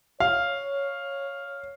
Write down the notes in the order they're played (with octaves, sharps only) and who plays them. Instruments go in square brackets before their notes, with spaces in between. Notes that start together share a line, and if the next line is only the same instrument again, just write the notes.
[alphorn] C#5 [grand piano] F5